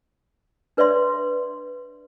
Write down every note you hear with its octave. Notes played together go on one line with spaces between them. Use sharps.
D4 B4 C#5 D5 E5 C6